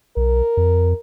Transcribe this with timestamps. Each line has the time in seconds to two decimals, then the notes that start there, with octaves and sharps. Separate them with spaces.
0.17 B1 A#4
0.57 F2